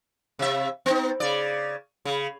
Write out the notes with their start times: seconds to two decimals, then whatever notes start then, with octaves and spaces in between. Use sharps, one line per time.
0.39 C3 E5
0.86 B3 D#4
1.20 C#3 D5
2.05 C#3